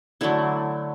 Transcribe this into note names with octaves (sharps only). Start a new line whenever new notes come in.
D3 F#3 A3 E4